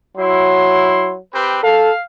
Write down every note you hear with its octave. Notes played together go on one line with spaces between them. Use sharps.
F#3 E4 C6
C4 G4 B4
A4 F5